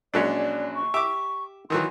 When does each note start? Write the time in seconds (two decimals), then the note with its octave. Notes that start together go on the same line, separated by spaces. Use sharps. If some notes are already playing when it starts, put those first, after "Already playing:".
0.14 A#1 F#3 G#3 C#4 D4 D5
0.76 C#6
0.94 G4 E5 D6
1.70 D#3 E3 F#3 C6